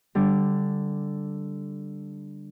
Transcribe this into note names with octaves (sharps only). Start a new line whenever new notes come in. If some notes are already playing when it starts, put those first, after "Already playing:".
D3 G3